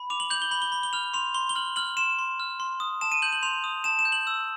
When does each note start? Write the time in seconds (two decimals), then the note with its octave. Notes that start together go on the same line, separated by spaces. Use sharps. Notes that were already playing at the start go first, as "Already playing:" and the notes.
Already playing: B5
0.10 D6 F7
0.20 F#7
0.30 G6 F#7
0.42 G7
0.51 B5 F#7
0.62 G7
0.72 B5 G7
0.83 G7
0.93 F6 F7
1.14 C6 F7
1.34 C6 G7
1.49 G7
1.56 F6 F#7
1.76 F6 F#7
1.97 C6 E7
2.19 C6
2.40 F6
2.60 C6
2.80 D#6
3.01 A5 E7
3.12 D#7
3.22 G6 F#7
3.33 F#7
3.42 C6 F7
3.64 D#6
3.84 A5 E7
3.99 E7
4.05 G6
4.12 F#7
4.27 E6